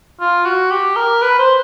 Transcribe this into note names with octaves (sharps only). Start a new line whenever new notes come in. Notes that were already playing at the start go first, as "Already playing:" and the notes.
F4
F#4
G4
A#4
B4
C5